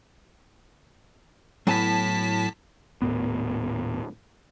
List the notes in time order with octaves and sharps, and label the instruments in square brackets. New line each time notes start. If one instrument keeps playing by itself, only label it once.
[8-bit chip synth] A2 A5 B6 [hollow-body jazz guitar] F#3 B3 G#5
[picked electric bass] D#1 A2 B3